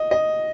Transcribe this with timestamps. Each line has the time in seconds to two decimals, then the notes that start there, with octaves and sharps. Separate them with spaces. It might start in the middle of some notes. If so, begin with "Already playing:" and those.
Already playing: D#5
0.11 D#5